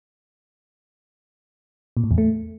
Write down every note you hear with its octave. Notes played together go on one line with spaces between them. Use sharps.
A#2
A2
E2
A3